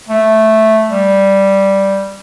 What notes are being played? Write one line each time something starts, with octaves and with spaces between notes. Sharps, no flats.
A3
G3